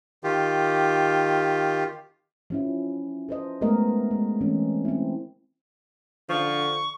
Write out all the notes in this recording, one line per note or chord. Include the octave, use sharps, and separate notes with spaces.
D#3 F4 G4
F3 C#4 E4
A4 C5 D#5
G#3 A3 B3 A#4 D#5
G#3
E3 A3 C4 C#4
C4 E4
D3 F3 C#6